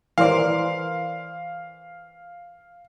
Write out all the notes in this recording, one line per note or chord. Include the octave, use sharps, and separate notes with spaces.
E3 A#4 C5 D5 F5